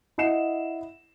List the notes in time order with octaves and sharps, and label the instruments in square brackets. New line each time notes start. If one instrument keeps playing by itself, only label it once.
[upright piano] E4 D#5 F#5 C7 E7